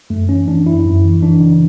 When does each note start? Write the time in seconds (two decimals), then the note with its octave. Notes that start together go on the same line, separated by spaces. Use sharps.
0.10 F#2 A3
0.29 E3 C#4
0.48 E3 D4
0.66 F#2 E4
0.85 F#2
1.04 E3
1.22 E3 D4
1.41 C#3